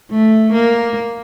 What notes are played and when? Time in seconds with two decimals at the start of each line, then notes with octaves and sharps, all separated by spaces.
0.11 A3
0.53 A#3